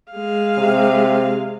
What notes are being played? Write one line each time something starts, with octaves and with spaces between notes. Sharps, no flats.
G#3 F5
C3